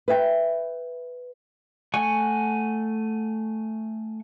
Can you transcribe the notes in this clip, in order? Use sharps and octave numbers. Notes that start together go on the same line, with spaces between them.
B4 E5 G5
A3 F#5 G#5 C#6